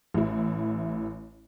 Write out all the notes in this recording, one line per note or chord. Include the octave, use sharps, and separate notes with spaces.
A1 E4